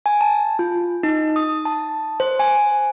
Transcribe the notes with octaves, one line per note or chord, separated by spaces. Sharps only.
G#5
A5
F4
D#4
D#6
A5
C5
G#5